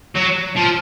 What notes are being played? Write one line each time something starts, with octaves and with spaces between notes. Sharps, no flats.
F#3
F3